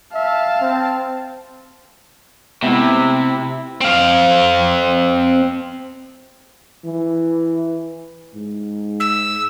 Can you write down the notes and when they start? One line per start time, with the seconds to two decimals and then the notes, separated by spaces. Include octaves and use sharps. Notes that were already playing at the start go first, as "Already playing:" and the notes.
0.14 E5 F5 A5
0.61 C4
2.62 C3 G#3 A3 B3 E4
3.81 C4 F5
6.85 E3
8.35 G#2
9.00 E6